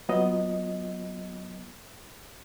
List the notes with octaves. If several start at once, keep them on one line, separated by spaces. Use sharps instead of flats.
F#3 B3 F4 D#5